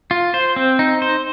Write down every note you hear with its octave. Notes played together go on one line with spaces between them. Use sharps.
F4
C5
C4
D#4
C5